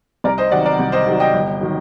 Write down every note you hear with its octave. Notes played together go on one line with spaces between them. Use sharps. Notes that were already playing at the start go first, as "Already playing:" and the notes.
C2 A#4 D5
C5 D#5
C3 D#3 F#3 D5 F#5
A#4 D5
C2
C5 D#5
C3 D#3 F#3
D#5 G5
G1
D#3 F#3